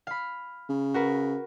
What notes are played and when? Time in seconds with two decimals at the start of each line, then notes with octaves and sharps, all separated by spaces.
0.07 F5 B5
0.69 C#3
0.94 F#4 A#4 B4